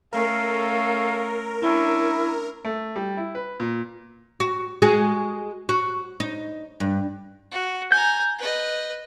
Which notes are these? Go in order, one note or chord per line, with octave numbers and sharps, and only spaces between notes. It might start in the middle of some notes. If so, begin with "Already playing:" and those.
A3 C#4 A4 A#4 F5
C#4 D4 E4
A3
G3
E4
B4
A#2
F#4
G#3 F#4 G#4
F#4
D#4
G2
F#4
G#5 A#5 G6
B4 D#5